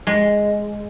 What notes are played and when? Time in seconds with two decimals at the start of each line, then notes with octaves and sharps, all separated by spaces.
0.07 G#3